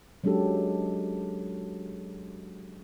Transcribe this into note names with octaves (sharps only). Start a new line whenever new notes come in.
F#3 G#3 C#4 D4 G4 A4